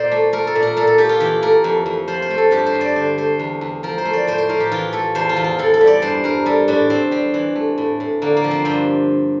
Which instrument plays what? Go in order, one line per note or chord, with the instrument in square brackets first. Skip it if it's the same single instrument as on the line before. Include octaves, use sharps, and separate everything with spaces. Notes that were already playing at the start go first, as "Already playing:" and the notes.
Already playing: [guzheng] A#2 C5 D5
A3
A3 A#4
A4
A#2
A#4
A#2 A4
A4
A3 G4
F4
E3 G4
A3 A#4
F2
F2
F3 C5
C5
A3
A4
G2 G4
C5
G2
D5
D3 C5
A3 C5
E2
E2
F3 A#4
C5
A3
D5
A2 C5
C5
A2 A#4
G4
E3 F4
A3 A4
E2 C5
F4
E2
F4
E3 A4
A4
G3
D5
G2 C5
G2 A#4
G3 A4
A2 D4
A2 C4
G3 C4
E3
A3
A2
A2
D3 A#3
A#3
F3
C4
G2 C4